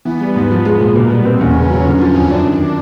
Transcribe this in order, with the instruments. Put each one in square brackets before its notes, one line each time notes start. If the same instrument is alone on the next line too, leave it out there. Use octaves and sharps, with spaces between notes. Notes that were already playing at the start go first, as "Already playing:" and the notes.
[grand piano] E3 [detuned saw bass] B3
[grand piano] G3
G#2
F3
G#3
A#2
[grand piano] B2 [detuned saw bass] A#3
[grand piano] G3 [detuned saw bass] B3
[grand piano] A#3 [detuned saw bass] C4
[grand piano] E2 [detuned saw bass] C#4
[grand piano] C#3
F#3
D3
F3
F2
[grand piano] F#2 [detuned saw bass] D4
[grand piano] D#3